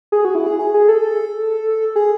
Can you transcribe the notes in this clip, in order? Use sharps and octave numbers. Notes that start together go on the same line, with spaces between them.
G#4
F#4
E4
G#4
G#4
G#4
A4
G#4